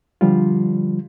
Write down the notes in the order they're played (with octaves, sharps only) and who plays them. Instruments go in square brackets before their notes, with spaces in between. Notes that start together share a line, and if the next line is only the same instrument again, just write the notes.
[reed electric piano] D3 F3 G3 F4